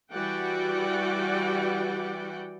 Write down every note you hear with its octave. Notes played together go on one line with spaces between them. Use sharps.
E3 G3 F#4 D5 F#5 G5